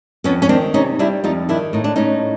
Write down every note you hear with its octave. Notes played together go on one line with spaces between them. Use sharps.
F2 B3 C#4
C#4
D#3 C4 D4
C3 C#4 D#4
G3 D4 E4
F2 D#4 F4
D#3 D4 E4
A2 D#4
D4
A2 C#4 D#4